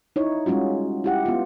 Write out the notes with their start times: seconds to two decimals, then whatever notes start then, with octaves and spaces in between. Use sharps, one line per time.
0.16 D#4 E4 C#5
0.46 G3 G#3 C#4 F4 F#4
1.04 E4 G4 F#5
1.26 B3 F4